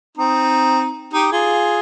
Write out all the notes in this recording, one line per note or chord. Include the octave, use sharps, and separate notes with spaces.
C4 D#4
D#4 G4
F4 G#4